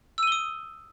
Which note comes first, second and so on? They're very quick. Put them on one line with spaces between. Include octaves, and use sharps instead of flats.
E6 D#7 G7 D#6